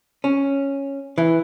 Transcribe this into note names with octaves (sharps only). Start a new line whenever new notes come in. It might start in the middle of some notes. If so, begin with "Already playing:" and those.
C#4
E3